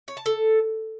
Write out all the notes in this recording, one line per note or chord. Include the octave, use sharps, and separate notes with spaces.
C#5
A5
A4